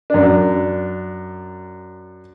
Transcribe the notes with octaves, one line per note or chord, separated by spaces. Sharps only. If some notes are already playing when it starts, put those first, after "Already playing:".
F#2 D4